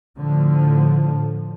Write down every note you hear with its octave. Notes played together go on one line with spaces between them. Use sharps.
A2 D3 F3